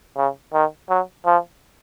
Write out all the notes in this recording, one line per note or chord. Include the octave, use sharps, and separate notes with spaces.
C#3
D#3
F#3
F3